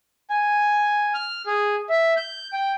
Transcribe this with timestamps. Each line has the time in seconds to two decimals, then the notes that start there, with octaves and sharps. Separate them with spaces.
0.30 G#5
1.14 F6
1.46 G#4
1.90 E5
2.16 G6
2.53 G5